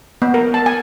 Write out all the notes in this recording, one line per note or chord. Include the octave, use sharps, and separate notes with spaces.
B3
A#4
A5
G#5